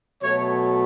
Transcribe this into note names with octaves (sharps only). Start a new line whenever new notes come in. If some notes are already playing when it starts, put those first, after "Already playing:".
B2 F#3 A3 C#5